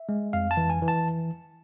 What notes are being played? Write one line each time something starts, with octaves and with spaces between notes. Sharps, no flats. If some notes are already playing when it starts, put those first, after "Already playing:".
Already playing: E5
G#3
F2 F5
A5
E3
G#5
E3
A5